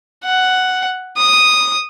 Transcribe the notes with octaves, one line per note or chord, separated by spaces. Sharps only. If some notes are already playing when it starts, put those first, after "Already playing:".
F#5
D#6